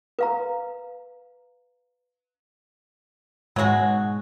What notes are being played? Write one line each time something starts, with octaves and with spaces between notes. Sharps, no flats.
B4 F5 A#5
G#2 B2 F#3 G#3 F#4